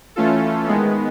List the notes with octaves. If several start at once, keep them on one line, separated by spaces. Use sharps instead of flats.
E3 A3 C#4 F4 A4
D#3 G#3 B3